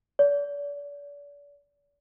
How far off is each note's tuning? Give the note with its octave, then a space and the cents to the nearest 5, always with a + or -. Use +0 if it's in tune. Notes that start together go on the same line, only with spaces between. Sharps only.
D5 -40